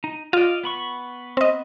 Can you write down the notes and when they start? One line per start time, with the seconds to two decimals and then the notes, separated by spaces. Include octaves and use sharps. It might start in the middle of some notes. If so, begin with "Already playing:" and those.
0.04 D#4
0.33 F4 D5 D#5 F5
0.64 B3 B5 C#6
1.37 C4 D#5